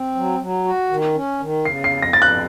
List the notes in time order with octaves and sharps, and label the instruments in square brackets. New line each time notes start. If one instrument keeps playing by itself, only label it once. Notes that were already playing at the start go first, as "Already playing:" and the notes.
Already playing: [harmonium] C4
F#3
F#3
F#4
D#3
C#4
D#3
[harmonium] C#3 [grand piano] C7
[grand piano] C7
[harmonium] F2
[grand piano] A#6
[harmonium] F2 [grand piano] A6
[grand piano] F#6